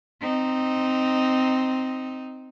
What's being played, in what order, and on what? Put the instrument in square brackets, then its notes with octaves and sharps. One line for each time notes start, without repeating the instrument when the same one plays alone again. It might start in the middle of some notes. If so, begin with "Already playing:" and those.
[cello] C4 D#4